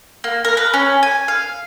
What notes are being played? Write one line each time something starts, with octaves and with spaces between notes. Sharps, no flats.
A#3
A#4
B4
C#4
G#5
F5